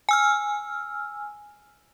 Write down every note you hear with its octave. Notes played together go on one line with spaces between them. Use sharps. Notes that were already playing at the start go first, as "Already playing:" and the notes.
G#5 E6 F6